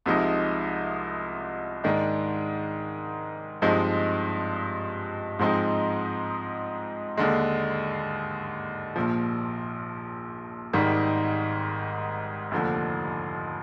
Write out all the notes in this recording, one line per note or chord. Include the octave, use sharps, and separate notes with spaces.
C2 C3 F3 G#3 D#4
G#2 D#3 G#3 D4
G2 F3 G#3 C4 D#4
G#2 F3 G#3 C4 D#4
D#2 D3 G#3
A#1 A#2 F3
G#1 G#2 D#3 G3
F1 D#2 D3 F3